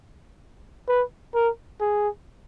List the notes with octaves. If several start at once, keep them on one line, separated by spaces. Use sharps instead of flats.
B4
A#4
G#4